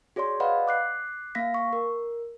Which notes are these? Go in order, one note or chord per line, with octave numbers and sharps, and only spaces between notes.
F#4 G#4 C#5 D5 C6
B4 D5 D#5 F5 F#5 B5
D6 F#6 C7
A#3 F5 A#6 B6
C#6
A#4